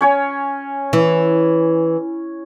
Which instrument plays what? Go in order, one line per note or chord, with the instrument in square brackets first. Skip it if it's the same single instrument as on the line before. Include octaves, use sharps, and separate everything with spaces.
[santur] C#4 C#5 G#5
[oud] E3